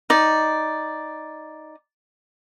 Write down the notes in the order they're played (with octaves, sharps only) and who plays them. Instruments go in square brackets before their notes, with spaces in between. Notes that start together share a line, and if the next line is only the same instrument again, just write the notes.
[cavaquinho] D#4 D5